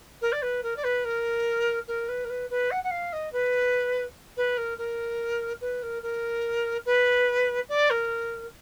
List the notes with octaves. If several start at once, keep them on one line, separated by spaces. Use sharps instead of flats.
A#4
D5
B4
A#4
D5
B4
A#4
A#4
B4
A#4
B4
B4
F#5
F#5
F5
D#5
B4
B4
A#4
A#4
B4
A#4
A#4
B4
D5
A#4